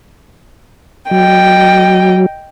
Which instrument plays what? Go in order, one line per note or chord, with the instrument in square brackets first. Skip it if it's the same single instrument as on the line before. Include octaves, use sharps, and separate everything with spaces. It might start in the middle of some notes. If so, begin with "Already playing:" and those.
[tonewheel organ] F#3 [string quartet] D#5 G5